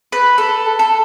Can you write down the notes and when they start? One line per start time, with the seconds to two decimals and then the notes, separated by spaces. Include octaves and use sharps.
0.12 B4
0.38 A4
0.79 A4